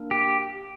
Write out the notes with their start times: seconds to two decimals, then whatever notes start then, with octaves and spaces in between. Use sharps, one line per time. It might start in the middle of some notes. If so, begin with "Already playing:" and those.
Already playing: A#3 D4 A#4
0.11 G4